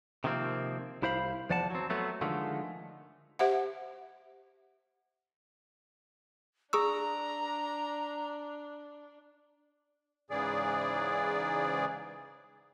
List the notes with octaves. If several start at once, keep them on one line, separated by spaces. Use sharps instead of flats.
C3 D#3 F3 A#3 C4
C2 E4 C5 F5 B5
E2 F3 D5 F#5 A5
F#3 C4
F#3 A3 B3
D3 D#3 F3 G#3 A3
G4 C5 E5 F#5
D4 G#4 A#5 C#6 E6
G#2 C#3 E3 G#4 D5